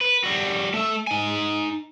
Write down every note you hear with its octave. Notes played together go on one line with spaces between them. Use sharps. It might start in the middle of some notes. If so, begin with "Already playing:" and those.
B4
G3 F#4
A3 E5
D#4 G#5